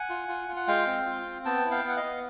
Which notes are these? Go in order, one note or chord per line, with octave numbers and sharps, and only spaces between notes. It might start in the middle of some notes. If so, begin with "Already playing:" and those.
Already playing: F#5 G#5
F4
F4
F4
F#5
G#3 F5 G5
C4
F4
C4
B3 G5 A5
E4
F5 G5
B3 F#5
D#5 F5
B3